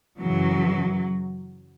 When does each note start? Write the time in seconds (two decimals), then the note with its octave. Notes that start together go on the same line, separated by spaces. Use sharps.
0.20 F#2 C#3 E3 F#3